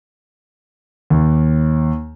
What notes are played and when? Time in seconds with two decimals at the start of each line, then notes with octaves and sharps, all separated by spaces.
1.10 D#2